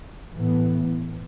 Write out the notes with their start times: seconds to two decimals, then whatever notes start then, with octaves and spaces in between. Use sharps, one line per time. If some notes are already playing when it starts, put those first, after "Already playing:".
0.34 A2 E3 B3